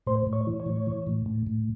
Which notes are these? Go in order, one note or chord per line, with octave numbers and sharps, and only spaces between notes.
A2 C5
A2
C#5
E3
C#5
A2
E3
A2
A2
A2